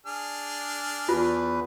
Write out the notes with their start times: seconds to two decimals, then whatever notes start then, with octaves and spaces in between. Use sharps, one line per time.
0.06 D4 G#4 F6
1.09 E2 F4 B4